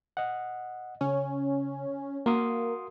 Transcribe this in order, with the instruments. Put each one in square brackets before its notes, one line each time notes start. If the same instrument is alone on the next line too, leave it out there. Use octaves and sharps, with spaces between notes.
[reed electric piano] D#5 F#5
[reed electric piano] C#3 [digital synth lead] C#4
[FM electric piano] A#3 [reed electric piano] F#4 C6 D#6